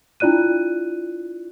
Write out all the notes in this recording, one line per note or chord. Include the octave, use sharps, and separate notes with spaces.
D4 E4 F4 D5 F#6 D#7